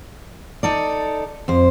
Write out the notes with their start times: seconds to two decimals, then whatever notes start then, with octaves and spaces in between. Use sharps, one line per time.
0.63 D#4 A4 D5
1.48 F2 C5